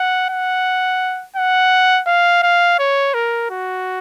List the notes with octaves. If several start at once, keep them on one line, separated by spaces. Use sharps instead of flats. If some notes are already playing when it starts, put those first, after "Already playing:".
Already playing: F#5
F#5
F#5
F5
F5
C#5
A#4
F#4